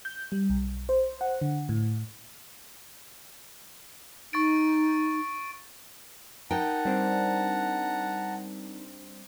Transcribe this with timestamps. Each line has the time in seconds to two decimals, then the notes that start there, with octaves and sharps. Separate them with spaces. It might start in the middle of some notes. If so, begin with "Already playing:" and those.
0.05 G6
0.32 G3
0.50 B1
0.89 C5
1.21 F#5
1.41 D3
1.69 A2
4.33 D#4 C#6 A6 D7
6.50 D#4 A#4 F#5 G5 A5 A#5
6.85 G3 C4 D4